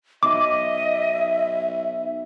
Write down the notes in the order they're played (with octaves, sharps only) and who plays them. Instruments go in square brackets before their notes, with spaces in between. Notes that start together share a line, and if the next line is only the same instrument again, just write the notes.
[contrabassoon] B1 [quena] D#5 [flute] E5 [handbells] D6